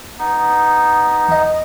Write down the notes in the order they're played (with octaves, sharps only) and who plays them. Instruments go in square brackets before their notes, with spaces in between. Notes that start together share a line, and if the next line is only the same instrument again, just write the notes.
[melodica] B3 D#4
[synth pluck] E2 D#5